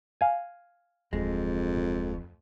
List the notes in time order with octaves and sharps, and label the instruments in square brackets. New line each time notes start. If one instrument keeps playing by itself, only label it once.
[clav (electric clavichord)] F5 G#5
[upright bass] D1 [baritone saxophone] F2 [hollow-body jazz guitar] G#3